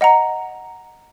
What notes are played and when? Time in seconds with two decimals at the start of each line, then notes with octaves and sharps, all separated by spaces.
0.01 D#5 F#5 A#5